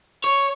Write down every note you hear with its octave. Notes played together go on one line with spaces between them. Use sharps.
C#5